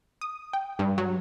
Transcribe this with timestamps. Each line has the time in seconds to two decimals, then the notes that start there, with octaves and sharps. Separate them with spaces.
0.21 D#6
0.53 G5
0.79 G2
0.98 F#3